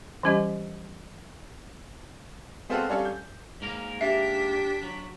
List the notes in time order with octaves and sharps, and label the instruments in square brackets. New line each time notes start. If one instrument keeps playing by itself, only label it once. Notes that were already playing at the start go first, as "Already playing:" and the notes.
[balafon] E3 G3 C#4 G4 D#5
[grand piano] G#3 B3 C4 F4 F#4 A4
G3 C#4 D4 A4 C#5 F5
G6
[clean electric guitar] G#2 A#3 A#4
[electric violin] D4 B6 [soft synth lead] G4 [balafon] E5
[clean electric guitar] F#3